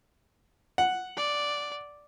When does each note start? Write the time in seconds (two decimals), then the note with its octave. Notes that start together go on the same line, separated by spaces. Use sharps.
0.78 F#5
1.17 D5